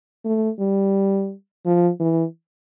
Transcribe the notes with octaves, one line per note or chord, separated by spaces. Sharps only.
A3
G3
F3
E3